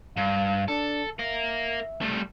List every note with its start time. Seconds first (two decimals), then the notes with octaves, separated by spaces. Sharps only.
0.17 G2 F5
0.68 D4 A4
1.19 A#4 E5 F5
2.01 G3 A3